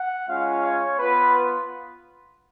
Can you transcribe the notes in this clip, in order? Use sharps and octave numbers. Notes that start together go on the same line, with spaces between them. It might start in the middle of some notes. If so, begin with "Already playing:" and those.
Already playing: F#5
G#3 C#4 F4 F5
C#5
B3 F4 B4